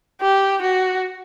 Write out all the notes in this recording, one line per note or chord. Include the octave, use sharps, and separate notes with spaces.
G4
F#4